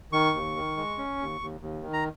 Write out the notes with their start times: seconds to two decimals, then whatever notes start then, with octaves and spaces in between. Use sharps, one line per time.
0.12 D#3 C#6
0.34 D#2
0.56 D#3
0.77 G#3
0.98 C#4
1.19 D#2
1.41 D#2
1.61 D#2
1.83 D#3
1.93 A#5